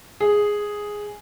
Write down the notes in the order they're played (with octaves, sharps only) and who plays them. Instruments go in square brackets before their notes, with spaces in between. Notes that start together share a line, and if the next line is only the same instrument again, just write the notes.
[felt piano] G#4